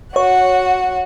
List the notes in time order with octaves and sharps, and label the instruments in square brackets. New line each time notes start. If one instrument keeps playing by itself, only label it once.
[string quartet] F#4 F#5 [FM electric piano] C#5